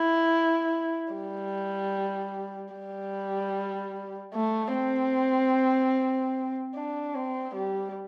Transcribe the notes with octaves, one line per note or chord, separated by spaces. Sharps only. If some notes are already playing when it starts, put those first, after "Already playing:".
Already playing: E4
G3
G3
A3
C4
D4
C4
G3